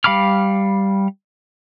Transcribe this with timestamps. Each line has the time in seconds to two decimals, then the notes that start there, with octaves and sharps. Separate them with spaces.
0.04 G3 F5 B5 D6 F6